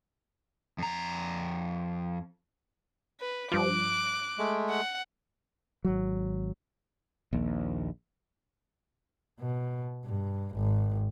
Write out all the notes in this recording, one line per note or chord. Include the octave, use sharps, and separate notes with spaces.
F2 A#5
B4
G2 F3 D6 F#6
G#3 A3
F#5
G#1 F#3
A#1 D#2
B2
G2
G#1